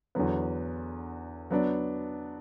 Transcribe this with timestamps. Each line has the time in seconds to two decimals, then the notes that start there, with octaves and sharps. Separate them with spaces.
0.15 E2 D3 F#3 B3
1.50 F#3 B3 D4